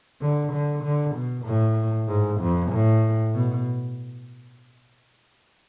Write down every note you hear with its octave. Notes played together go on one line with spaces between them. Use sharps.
D3
D3
D3
B2
A2
G#2
F2
A2
B2